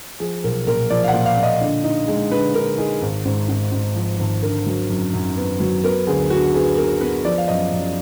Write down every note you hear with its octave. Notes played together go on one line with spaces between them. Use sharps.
F3 G#4
B1 A#4
A#2 A#4
F3 D5
F5
F#5
A#2
F5
A#2
D#5
D3
D#4
G#3
D3 B4
D3 A#4
D#4 G#4
G#1
G#2
G#2
G#2
F3
G#1
D3 A#4
F#3
F#2
F#2
B3
F#3
B3 A#4
D2 G#4
D3 F#4
B3 G#4
B3 A#4
B3 B4
F3 D5
F5
F#2 D#5
F#2